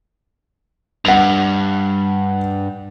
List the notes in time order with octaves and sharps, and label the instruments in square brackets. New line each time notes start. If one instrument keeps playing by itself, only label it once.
[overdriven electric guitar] G2 [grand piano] F#5 F7